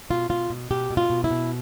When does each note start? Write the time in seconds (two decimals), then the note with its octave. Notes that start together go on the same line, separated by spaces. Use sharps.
0.10 B2 F4
0.30 B2 F4
0.50 B2
0.71 B2 G4
0.91 B2
0.97 F4
1.10 B2
1.24 E4
1.31 B2